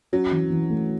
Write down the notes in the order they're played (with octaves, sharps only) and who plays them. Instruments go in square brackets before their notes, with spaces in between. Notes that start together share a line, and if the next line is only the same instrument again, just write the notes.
[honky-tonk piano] F#3 [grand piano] C#4
[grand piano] E3
E3
A3